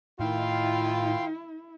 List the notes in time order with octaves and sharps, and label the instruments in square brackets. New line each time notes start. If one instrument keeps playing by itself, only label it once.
[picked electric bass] A2 [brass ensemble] D#3 F4 [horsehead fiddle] E4 [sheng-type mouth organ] F5 G5 C6